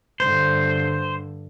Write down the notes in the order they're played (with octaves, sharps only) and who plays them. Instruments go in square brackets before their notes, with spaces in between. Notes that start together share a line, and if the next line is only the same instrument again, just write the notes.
[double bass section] G2 D3 [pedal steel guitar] C5